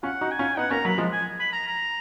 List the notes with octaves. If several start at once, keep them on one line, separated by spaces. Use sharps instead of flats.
C#4 F4 F#5
D#4 F#4
G#5
C#4 F4
B3 D#4 F#5
A#3 C#4 A#5
F#3 A#3 B5
F3 G#3
G#5
B5
A#5
A#5